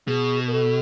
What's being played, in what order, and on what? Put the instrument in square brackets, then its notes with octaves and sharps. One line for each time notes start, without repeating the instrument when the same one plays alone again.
[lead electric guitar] B2 [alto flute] G#4
[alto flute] A#4
A4